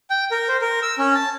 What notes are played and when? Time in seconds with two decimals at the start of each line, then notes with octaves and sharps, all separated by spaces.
0.10 G5
0.31 A#4
0.48 C5
0.61 A#4
0.83 E6
0.98 C#4
1.15 A5